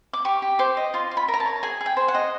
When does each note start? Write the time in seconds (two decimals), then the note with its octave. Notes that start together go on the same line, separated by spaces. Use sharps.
0.13 D6
0.25 G4 C#6
0.42 G4
0.59 C5 D6
0.77 D#5
0.94 F4 C6
1.11 F4
1.17 B5
1.28 A#4
1.34 A#5
1.40 A5
1.46 C#5
1.63 G#4 G#5
1.81 G#4
1.86 G5
1.97 C5
2.08 F#5
2.15 D#5